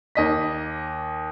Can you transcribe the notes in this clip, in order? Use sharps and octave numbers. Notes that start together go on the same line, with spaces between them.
D#2 D#5 B6